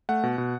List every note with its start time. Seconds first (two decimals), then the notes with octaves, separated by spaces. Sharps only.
0.09 A3 F#5
0.23 B2
0.38 B2